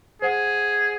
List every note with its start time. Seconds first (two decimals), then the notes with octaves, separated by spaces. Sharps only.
0.22 G#4 C5 F#5